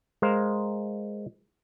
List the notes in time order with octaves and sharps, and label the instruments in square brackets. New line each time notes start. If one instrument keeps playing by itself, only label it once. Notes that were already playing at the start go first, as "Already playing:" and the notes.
[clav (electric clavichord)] G#3 A#4 C5 F5